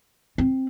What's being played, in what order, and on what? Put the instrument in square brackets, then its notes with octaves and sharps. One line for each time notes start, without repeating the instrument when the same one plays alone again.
[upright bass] C4